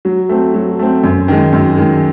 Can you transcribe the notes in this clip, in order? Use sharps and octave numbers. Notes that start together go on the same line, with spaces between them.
F#3
A3 C4
F#3
A3 C4
F#2
D#3 G#3
F#2
D#3 G#3